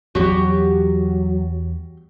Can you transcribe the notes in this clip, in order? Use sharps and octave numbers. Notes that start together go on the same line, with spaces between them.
E2 F#3 G3 F#4 G4